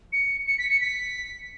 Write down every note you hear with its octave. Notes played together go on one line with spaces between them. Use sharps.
C#7
C#7
B6
C#7
B6